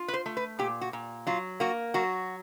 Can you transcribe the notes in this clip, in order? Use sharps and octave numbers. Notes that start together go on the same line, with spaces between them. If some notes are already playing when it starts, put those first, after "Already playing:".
Already playing: F4
B4
C5
A3
B4
A#2 G4
F#4
A#2
F#3 F4
A#3 F#4
F#3 F#4